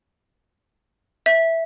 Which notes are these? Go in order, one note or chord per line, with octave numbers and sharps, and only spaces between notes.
E5